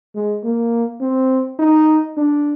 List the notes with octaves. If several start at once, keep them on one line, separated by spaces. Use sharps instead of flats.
G#3
A#3
C4
D#4
D4